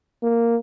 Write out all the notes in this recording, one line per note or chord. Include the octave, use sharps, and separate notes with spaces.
A#3